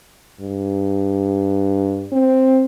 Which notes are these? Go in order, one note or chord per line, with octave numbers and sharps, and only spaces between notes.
G2
C4